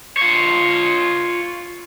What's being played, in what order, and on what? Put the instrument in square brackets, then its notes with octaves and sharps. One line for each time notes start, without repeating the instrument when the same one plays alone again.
[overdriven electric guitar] F4 C#5